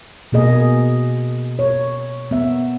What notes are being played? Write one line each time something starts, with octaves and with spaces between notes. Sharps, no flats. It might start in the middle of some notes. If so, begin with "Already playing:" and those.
B2 A#3 G#4 D#5
C#5
B3 E5